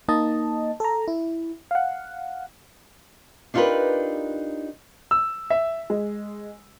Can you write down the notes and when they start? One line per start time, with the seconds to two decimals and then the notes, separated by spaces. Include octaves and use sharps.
0.08 A#3 D#4 D#5 A5
0.80 A4 A#5
1.08 E4
1.71 F5 F#5
3.54 D4 D#4 F4 G4 A#4 B4
5.11 E6
5.50 E5
5.90 G#3